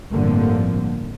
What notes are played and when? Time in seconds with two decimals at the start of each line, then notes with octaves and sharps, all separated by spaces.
0.13 G1 A2 D3 F3 A#3 C4